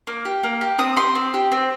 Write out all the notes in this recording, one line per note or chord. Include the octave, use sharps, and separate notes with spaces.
A#3
G4
A#3
G4
C4 D#6
G4 C6
C4
G4
C4